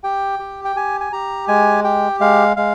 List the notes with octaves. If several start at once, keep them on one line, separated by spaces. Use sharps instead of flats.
G4 G5
G4
G5
G4 G#5
G#5
G4 A#5
G#3 G#5
G4 G5
G#3 F5
G#3 F5